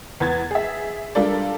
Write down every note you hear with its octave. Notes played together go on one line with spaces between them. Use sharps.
E2 B4 G#6 A6
G#4 E5
G3 D4 F4 A4 A#4 D5